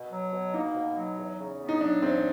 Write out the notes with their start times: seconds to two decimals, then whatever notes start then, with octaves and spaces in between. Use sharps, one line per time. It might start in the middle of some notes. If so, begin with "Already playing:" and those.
Already playing: B2
0.11 F#3
0.32 B2
0.54 A#3 D#4
0.75 B2
0.96 F#3
1.17 E2
1.38 C#3
1.60 B3
1.69 D#4
1.81 F#3 D4
2.02 E2 C4